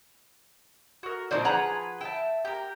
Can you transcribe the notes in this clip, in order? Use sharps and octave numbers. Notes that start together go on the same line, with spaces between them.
F#4 A#4
A#2 F3 C4 D#4 C5 D5
F3 G#4 B4 F#5 A#5
E5 G5 A5
G4 A#4